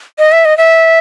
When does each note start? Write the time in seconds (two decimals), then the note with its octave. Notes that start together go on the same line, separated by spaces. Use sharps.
0.19 D#5
0.32 E5
0.45 D#5
0.58 E5